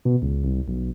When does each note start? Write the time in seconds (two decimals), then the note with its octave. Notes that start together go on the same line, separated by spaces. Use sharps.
0.05 B2
0.22 C#2
0.44 C2
0.68 B1